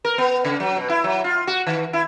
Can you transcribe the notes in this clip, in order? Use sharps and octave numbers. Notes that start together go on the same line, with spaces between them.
A#4
B3
C#3
F#3
B2
E4
F#3
F4
F#4
D#3
E4